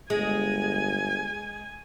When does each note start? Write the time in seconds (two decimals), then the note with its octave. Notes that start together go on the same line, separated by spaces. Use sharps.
0.10 G1 G#3 G#5